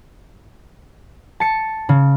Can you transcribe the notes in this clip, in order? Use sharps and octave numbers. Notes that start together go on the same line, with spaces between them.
A5 C#7
C#3